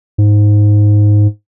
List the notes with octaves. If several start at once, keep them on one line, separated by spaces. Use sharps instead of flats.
G#2